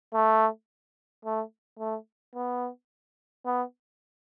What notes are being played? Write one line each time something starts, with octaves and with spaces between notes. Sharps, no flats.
A3
A3
A3
B3
B3